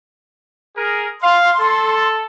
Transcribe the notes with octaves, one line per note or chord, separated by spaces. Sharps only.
G#4 A#4
F5 C6
A4